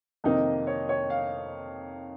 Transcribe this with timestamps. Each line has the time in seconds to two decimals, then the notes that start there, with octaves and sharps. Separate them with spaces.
0.24 F2 C3 D#3 A#3 D#4 D#5
0.67 C#5
0.89 C#5
1.10 F5